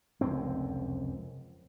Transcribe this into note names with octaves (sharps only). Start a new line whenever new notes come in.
F1 C#2 F#2 C4